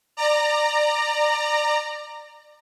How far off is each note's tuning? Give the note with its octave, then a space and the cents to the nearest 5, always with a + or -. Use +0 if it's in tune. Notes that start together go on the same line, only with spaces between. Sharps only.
D5 +25 A#5 -10